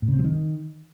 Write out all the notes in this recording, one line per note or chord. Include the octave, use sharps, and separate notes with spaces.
A2
C#3
C4
F#3
D#3